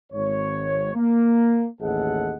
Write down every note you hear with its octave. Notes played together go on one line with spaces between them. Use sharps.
G#1 C#5
A#3
A1 D#2 G#4 A4 D#5 F#5